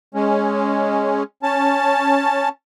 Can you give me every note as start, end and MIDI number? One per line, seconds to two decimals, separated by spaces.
0.14 1.23 56
0.14 1.23 61
1.43 2.49 61
1.43 2.49 81